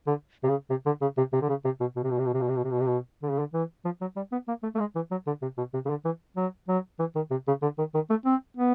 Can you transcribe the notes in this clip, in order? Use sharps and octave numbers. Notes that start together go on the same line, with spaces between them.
D3
C3
C#3
C3
D3
C#3
C3
C3
D3
C#3
C3
B2
B2
C3
B2
C3
B2
C3
B2
C3
B2
C3
B2
C3
B2
D3
C#3
D3
E3
F3
F#3
G3
B3
A#3
A3
A3
G#3
E3
F#3
D3
C3
B2
C3
C#3
D3
E3
F#3
F#3
E3
D#3
C3
C#3
D3
D#3
D#3
A3
C4
B3